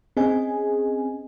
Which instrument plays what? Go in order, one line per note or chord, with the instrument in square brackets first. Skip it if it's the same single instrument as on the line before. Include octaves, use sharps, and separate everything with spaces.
[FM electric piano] C4 C#4 G#4 D#5 G#5